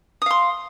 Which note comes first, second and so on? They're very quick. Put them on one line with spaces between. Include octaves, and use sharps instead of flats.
D#6 F5 C6